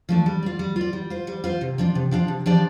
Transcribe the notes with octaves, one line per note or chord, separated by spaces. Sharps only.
F3 A3 D4
G3
F4 D5
G3
F4 D5
G3
F4 C5
G3
F4 C5
C3
F3 D4 F4
C3
F3 D4 F4
C3
F3 D4 G4 D5